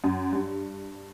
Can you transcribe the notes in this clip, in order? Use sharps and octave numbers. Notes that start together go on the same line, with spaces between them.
F#2
G2